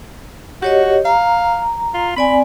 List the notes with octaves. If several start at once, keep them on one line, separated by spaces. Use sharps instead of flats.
F#4 G4 C#5 D#5
F5 A#5
F4
C4 D5 G#5 B5